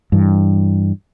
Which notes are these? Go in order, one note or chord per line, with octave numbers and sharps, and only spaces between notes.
G2 E3